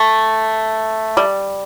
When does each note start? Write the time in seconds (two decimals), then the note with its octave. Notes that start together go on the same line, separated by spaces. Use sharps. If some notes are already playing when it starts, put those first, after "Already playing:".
Already playing: A3
1.17 G3